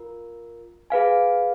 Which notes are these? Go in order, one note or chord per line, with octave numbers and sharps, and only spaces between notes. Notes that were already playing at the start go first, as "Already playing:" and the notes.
Already playing: F4 A#4
G#4 B4 F5 G#5